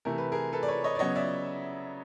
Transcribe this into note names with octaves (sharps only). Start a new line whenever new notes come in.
C3 E3 A3 A#4
B4
G#4 A#4
A4 B4
D5
B4 C#5
C#5 D#5
D5
C#3 F#3 B3 C#5 D#5
D5 E5